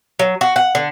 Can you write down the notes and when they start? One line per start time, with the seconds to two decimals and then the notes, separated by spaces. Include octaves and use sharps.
0.19 F#3
0.41 F#4
0.56 F#5
0.75 D3